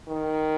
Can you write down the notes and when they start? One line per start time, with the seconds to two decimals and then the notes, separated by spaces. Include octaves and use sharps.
0.08 D#3